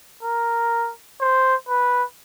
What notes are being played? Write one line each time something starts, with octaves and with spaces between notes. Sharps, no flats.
A#4
C5
B4